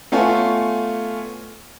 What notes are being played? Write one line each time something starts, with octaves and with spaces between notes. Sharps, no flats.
A3 B3 F4 C#5 G#5